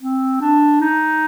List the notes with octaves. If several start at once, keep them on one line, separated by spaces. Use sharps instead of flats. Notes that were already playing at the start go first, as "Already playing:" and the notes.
C4
D4
D#4